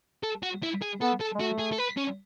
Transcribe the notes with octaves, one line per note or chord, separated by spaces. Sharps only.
A4
F#4
E4
G#4
B3 A4
A4
G#3
A3 F#4
G#4
A4
B4
C#4